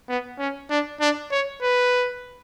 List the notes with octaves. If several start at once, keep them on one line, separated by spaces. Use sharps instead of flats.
B3
C#4
D4
D4
C#5
B4